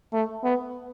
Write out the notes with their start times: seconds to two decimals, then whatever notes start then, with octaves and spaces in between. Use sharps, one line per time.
0.13 A3
0.44 B3